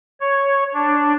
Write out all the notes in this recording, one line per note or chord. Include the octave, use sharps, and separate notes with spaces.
C#5
D4